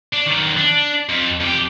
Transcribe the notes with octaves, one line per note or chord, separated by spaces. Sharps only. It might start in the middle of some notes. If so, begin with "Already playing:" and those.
D4
D#3 F#3
D4
F2
F2 G4